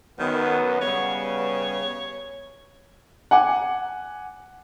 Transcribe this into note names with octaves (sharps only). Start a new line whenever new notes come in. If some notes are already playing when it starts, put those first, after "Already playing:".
F#2 D#3 F#3 B3
C#3 G3 B3 C#5
F#5 G#5 D6